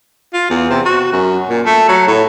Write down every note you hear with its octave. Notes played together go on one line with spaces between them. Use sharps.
F4
E2
C3
F#4
F#2
A#2
A3
F#3
A2